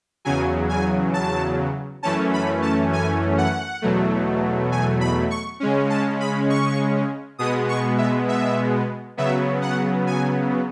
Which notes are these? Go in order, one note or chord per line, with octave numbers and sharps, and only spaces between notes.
E2 C#3 F#3 G#5
G#5
A5
F#2 E3 A3 C#4 A5
B5
A5
G#5
F#5
E2 B2 F#3 A3
G#5
B5
C#6
C#3 G#3 C#4
A5
B5
C#6
B2 G#3 B3 D#6
C#6
E5
E5
C#3 F#3 B3 E5
F#5
G#5